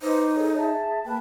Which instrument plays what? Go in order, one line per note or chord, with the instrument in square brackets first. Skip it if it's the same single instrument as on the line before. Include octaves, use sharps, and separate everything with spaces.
[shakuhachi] D#4 [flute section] B4 C5 D6
[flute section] G#4 A4 C#5
G#4 E5 A5
[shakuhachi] A#3 [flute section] B4 G5 A5